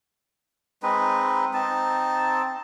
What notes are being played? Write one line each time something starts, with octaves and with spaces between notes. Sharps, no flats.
G#3 C4 D#4 B4
C4 D#4 A5